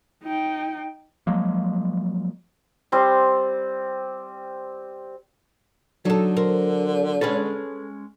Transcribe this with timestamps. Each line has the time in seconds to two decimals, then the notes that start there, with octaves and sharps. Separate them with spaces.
0.23 D#4 G5
1.27 F3 F#3 G#3 A#3
2.92 G3 C4 C6
6.05 D3 F#3 D#4 A4
6.37 A#4 C5
7.21 G#3 C#4 A4 B4